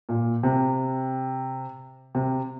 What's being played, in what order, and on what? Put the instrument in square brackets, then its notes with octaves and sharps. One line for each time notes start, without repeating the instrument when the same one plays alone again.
[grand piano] A#2
C3
C3